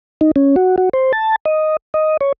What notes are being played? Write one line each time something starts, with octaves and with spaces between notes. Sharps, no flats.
D#4
C#4
F#4
F#4
C5
A5
D#5
D#5
C#5